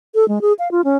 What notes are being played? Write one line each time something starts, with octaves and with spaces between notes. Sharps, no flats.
A4
G#3
G#4
F5
F4
C#4